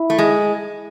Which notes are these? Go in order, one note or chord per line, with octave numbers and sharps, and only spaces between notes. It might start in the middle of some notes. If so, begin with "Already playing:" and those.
Already playing: E4
A3
G#3